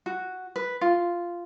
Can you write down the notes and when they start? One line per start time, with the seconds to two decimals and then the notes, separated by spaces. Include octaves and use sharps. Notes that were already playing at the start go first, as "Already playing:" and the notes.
0.06 F#4
0.56 B4
0.81 F4